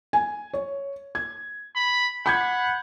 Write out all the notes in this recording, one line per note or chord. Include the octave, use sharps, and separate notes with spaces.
G#5
C#5
G#6
B5
F#5 B5 G6 G#6